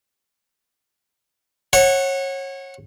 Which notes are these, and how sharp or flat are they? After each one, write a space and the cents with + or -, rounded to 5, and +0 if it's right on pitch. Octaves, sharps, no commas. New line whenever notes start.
C#5 -25 F#5 +0